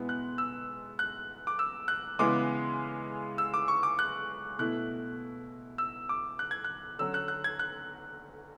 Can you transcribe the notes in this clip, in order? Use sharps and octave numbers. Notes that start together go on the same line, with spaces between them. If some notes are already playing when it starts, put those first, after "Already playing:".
Already playing: B2 G#3 B3 E4
F#6
E6
F#6
D6
E6
F#6
C#3 E3 G#3 B3 E4 D6
E6
D6
C#6
D6
F#6
B2 A3 E4 F#6
E6
D6
F#6
G#6
F#6
D3 F#3 C#4 E6
F#6
F#6
G#6
F#6